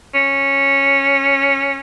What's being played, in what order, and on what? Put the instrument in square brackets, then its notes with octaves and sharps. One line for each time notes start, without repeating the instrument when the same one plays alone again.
[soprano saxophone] C#4